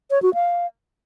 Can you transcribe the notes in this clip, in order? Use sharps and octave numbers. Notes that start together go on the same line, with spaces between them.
C#5
F#4
F5